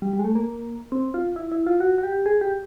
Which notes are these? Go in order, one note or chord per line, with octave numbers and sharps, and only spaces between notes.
G3
G3
G#3
A3
A#3
C4
F4
E4
E4
F4
F#4
F#4
G4
G#4
G4